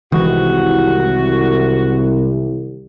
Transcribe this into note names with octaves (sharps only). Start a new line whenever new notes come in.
C2 D#3 E3 G#3 F#4